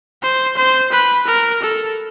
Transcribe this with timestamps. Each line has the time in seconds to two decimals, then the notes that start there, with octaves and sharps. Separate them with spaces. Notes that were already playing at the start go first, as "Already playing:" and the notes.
0.23 C5
0.57 C5
0.92 B4
1.27 A#4
1.62 A4